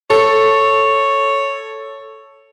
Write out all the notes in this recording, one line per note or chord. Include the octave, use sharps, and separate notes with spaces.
A4 C#5